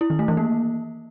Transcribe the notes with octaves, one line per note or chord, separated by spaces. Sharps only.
E4
D#3
A3
E3
A#3